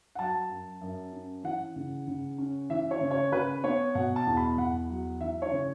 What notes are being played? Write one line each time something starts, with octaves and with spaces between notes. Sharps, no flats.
F#5
F#3 A5
F#2
F#2
C#4
E3 F#5
C#3
C#3
C#4
E3 E5
C#5
C#3
C#5
C#3 B4
B3 C#5
B2 F#5
A5
E2
B5
E2 F#5
F#3
E3 E5
C#5
C#3